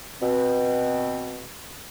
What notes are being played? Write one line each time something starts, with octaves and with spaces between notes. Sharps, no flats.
B2 C4